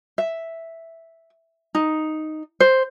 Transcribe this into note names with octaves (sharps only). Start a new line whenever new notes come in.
E5
D#4
C5